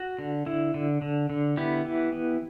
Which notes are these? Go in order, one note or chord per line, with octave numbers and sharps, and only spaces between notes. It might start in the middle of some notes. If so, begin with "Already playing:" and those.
Already playing: F#4
D3
D3 E4
D3
D3
D3
B3 E4 G4
E3
B3